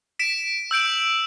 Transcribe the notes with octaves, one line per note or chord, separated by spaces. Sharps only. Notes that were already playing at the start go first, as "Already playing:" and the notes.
B6 D7 E7
E6 G6 D7 F#7